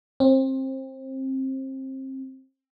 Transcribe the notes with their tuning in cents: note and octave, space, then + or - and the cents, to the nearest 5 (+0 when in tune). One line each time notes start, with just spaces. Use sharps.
C4 +25